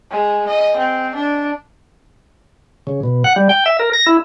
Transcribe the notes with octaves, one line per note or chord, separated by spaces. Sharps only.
G#3
D#5
C4
D4
C#3
B2
F#5
G3
G5
E5
A#4
A#6
E4